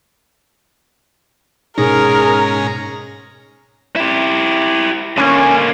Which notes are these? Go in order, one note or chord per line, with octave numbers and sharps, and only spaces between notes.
G#2 B2 C#4 D#4 G#4 A#4 A#5
E4 G4
D3 A#3 C#4